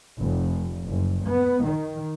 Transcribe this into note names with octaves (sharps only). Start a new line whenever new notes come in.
F1
F#1
B3
D#3